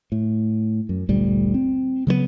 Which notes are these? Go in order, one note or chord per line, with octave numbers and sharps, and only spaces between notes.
A2
F#2
G1 D2 A#2 G3
C4
C#3 F#3 G3 B3